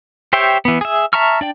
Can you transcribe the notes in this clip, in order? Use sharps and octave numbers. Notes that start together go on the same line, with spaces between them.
G4 C5 C#5 E5 G5
E3 B3
G#4 E5
E5 A5 A#5 C#6 F6
D4 D5 G5